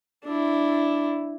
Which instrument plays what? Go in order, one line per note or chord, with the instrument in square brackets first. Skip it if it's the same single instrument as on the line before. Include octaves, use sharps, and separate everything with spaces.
[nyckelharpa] D4 E4